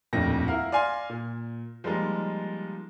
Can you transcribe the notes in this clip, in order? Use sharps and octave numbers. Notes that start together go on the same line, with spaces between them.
D#1 F2 A2 D#3 D4 A#6
E4 A#4 F5 F#5
D5 F5 G#5 C6
A#2
F3 G3 G#3 A#3 D#4